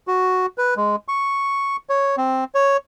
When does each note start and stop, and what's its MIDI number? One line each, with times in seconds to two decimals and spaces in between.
0.07 0.46 66
0.58 0.74 71
0.77 0.96 56
1.08 1.76 85
1.89 2.16 73
2.17 2.44 60
2.55 2.77 73